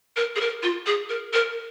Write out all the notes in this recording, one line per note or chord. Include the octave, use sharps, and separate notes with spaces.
A#4
G#4
A#4
F4
G#4
A#4
A#4